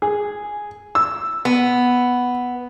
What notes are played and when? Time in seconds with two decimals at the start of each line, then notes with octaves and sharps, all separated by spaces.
0.02 G#4
0.95 E6
1.45 B3